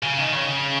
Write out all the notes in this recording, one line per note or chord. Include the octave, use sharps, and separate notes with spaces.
C#3
D#3
C#3